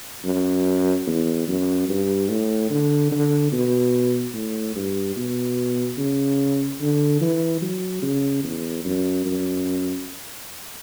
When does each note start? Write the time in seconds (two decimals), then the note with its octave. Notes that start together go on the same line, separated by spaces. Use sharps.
0.25 F#2
1.07 E2
1.48 F#2
1.89 G2
2.29 A2
2.70 D3
3.12 D3
3.52 B2
4.34 A2
4.75 G2
5.16 B2
5.98 C#3
6.80 D3
7.21 E3
7.62 F#3
8.02 C#3
8.43 E2
8.85 F#2
9.25 F#2